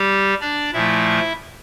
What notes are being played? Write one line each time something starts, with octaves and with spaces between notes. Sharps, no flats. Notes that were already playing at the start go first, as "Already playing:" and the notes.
Already playing: G3 G4
D4 D5
A#2 F3 A3 E4 E5